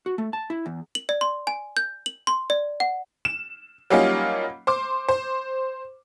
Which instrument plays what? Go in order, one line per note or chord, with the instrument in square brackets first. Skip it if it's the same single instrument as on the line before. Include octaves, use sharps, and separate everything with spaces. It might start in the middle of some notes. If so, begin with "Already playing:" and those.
[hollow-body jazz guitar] F#4
A3
A5
E4
E2
[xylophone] F#7
D5
C6
G#5
G6
F#7
C6
D5
F#5
[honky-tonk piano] E7
F#3 G3 A#3 C#4 D#4 F4
C5 C6 D6
C5